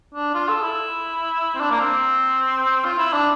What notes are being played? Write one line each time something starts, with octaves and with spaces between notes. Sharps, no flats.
D4
F4
A4
E4
C4
D4
A#3
C4
F4
E4
D4